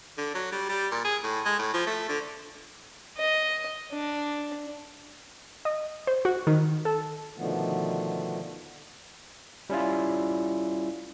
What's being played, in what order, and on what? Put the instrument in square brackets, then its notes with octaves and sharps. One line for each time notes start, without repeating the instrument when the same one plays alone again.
[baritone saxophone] D3
F#3
G3
G3
A#2
G#4
A2
G#3
A2
F3
A3
D3
[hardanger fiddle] D#5
D4
[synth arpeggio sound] D#5
C5
F#4
D#3
A4
[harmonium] B2 D3 D#3 F3 A3 B3
[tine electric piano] G3 C#4 E4 F4